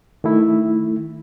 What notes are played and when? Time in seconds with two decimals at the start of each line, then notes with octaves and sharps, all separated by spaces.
0.24 D#3 A3 E4